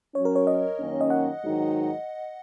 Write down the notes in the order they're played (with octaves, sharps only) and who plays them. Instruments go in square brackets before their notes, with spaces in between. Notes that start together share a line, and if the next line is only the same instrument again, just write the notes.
[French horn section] F#2 F#3 C#4 [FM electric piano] C#5
[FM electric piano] A#4
C#5
D#5
[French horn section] F#2 D#3 A#3 C#4
[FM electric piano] D#5
F#5
[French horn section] G#2 D#3 F#3 D#4